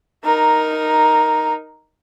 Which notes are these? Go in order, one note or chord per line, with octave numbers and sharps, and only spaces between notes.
D#4 A#4